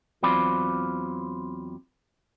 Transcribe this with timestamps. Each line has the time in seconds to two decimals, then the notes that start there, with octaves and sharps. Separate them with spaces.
0.23 E2 F#3 C4 F4 D5 B5